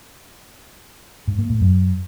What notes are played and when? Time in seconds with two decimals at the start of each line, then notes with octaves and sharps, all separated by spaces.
1.27 G#2
1.39 A#3
1.50 A2
1.61 F#2